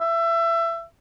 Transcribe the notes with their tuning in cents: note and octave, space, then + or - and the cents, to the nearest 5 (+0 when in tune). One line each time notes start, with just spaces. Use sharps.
E5 +25